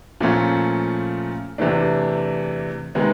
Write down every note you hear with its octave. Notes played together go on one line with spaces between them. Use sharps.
A#2 F3 A3 C#4 F4
E2 C3 E3 A3 D4
C3 D#3 G#3 B3